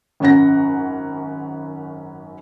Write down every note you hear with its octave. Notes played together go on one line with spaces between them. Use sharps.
G#1 F#2 C#4 F#5 A#6